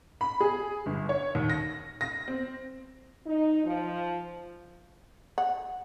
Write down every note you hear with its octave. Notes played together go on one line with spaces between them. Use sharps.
B5
G#4
G1
C#5
D#2
A#6
A#6
C4
D#4
F3
F#5